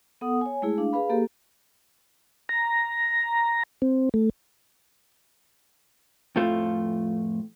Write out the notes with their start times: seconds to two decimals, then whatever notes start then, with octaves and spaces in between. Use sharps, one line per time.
0.21 B3 A4 F#5 D#6
0.41 C#5 G#5
0.62 G#3 A3 E4 G#4
0.78 D4 F5
0.93 G#4 B4 F5 B5
1.10 A#3 G4 A4
2.49 A#5
3.82 C4
4.14 A3
6.36 F2 A2 F3 A3 F4